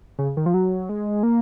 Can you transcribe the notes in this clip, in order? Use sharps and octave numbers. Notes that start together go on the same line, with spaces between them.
C#3
D#3
F3
F#3
G#3
A#3